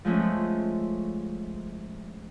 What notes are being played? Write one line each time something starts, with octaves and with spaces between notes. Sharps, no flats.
F3 G#3 A3 C#4